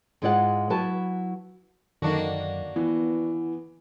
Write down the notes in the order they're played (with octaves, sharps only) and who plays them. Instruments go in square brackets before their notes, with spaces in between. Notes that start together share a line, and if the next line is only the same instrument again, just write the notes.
[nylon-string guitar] G#2 G#3 E4 F4 D5 F#5
F#3 E4 B4 A5
[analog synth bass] F#2 [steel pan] D3 D#3 [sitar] A#3 D4 F#4
[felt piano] E3 [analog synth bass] B3